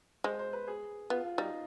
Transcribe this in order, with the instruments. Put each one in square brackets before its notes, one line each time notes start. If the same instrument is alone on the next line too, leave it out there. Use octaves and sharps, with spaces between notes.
[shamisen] G#3 [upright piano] C5
[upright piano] C5
B4
G#4
[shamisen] B3 [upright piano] F4
[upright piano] F4
[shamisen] G3 [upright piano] D#4